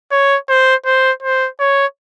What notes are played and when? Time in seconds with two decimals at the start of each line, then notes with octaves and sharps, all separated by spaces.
0.11 C#5
0.49 C5
0.86 C5
1.23 C5
1.60 C#5